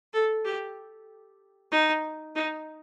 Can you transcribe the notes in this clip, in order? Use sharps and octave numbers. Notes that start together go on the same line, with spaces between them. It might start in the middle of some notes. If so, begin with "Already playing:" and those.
A4
G4
D#4
D#4